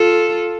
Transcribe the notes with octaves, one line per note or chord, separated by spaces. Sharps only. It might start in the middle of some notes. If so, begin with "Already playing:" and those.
Already playing: F4 A4